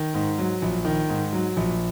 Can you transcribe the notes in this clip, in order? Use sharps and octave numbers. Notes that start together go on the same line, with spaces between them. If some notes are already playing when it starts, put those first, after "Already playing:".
Already playing: D#3
G#2
F#3
A#1
D#3
G#2
F#3
A#1